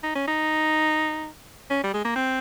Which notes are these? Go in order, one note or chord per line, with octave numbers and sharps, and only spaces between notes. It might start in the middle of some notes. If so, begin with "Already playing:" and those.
D#4
C#4
D#4
C#4
G3
G#3
A#3
C4